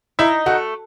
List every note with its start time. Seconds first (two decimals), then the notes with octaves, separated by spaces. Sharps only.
0.19 D#4 E4
0.46 A3 F#4